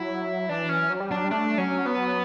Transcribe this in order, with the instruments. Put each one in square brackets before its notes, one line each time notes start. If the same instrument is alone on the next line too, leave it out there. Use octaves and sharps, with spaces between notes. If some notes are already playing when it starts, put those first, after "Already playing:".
Already playing: [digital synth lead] F#3 [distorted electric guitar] E4
[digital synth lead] E3 [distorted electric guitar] D4
[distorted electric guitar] C#4
[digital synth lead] F#3
G3
[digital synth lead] F#3 [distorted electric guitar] D4
[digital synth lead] G3
[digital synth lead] A3 [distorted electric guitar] D4
[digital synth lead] F#3 [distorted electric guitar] C#4
[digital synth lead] F#3 [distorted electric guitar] B3